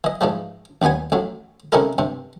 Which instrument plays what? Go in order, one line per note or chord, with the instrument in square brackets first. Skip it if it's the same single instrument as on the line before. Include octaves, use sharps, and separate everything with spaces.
[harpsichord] E3 D#5
G#2 E3 F3 G3
A1 D#2 G3 B3 G#5
A1 A2 F#3
C3 C#4 D#4 E4 A4 A#4
G2 C3